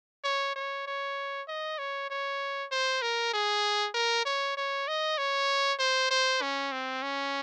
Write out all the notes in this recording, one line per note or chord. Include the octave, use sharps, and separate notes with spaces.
C#5
C#5
C#5
D#5
C#5
C#5
C5
A#4
G#4
A#4
C#5
C#5
D#5
C#5
C5
C5
C#4
C4
C#4